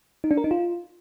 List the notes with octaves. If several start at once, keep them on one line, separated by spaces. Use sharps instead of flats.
D#4
D4
A#4
D#4
F4